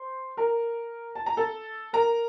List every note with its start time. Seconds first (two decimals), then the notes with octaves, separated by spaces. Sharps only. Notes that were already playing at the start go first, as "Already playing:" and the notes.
Already playing: C5 C6
0.37 A#4 A#5
1.15 A5
1.26 A#5
1.37 A4 A5
1.93 A#4 A#5